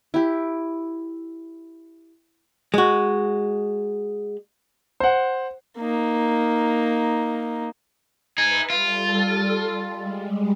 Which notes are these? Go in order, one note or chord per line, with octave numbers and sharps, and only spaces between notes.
E4 G4
G#3 F#4
C5 F#5
A#3 D#4
D#4 G#4 B4 E5
G3 F4 A4
G3 G#3